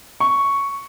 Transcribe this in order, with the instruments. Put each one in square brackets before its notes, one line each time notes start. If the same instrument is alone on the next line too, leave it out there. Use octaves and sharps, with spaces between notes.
[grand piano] C#6